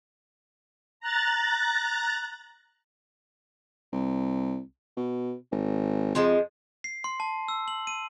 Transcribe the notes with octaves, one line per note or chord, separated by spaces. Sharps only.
A#5 F#6 A6
C2
B2
G#1
F2 F3 G#3
C7
C6
A5
E6
F#7
D#7